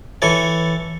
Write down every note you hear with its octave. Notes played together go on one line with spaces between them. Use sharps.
E3 A4 C#5